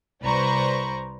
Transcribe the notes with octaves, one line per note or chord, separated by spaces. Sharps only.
C2 B4 C5 D5 A#5 C#6